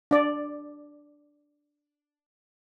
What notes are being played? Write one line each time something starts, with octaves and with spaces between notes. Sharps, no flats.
D4 D5